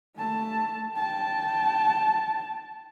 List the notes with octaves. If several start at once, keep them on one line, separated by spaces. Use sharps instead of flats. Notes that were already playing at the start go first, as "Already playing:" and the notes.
A3 A5
G5 A5